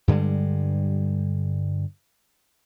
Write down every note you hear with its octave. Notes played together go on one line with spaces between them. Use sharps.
G2 D3 G3 G#3